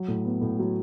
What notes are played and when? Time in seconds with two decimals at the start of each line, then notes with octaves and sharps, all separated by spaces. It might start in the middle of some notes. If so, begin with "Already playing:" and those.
Already playing: F#3
0.08 A2
0.25 B3
0.41 A2
0.59 F#3